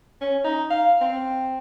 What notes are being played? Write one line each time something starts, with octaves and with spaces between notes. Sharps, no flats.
C#4
D#4
F5
C4